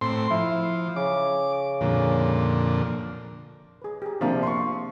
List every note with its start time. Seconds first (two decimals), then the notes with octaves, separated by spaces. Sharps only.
0.01 A2 C4 C6
0.31 F3 E4
0.96 C#3 D6
1.81 F2 A#2 D3
3.82 G#4 B4
4.02 G4 G#4
4.21 C3 F3 A#3 D4
4.43 C6 C#6